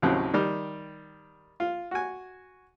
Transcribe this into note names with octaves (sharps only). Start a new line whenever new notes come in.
D#2 A2 C#3 F#3 C4
D#3 G3
F4
F#4 G#5